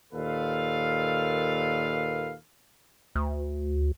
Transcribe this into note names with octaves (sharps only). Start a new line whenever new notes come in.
D#2 A#2 A4 B4 F5
D2